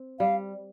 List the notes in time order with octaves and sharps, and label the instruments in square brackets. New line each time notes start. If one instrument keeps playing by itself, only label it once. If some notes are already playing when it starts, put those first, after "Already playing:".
Already playing: [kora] C4
[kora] G3 [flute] F5